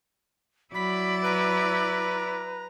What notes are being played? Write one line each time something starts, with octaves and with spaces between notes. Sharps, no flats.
F#3 E4 D5 B5
B4 A#5